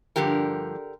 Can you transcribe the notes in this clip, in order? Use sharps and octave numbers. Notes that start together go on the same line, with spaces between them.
G2 D3 F3 G4 A#4